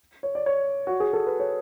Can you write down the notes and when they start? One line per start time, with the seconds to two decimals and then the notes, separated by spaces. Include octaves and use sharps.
0.23 C#5
0.35 D5
0.46 C#5
0.87 F#4
1.00 G#4
1.13 A4
1.27 B4
1.40 C#5